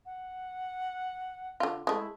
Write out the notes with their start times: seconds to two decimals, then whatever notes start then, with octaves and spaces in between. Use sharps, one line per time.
0.06 F#5
1.60 D3 F4
1.87 G#3 A3 E4